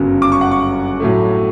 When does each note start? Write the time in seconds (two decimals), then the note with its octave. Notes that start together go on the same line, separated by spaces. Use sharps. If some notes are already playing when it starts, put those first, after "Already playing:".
Already playing: G1 F#2 C#3 F#3
0.22 D6
0.32 C#6
0.41 F#5
0.51 C#6
1.00 A2 F#3 A3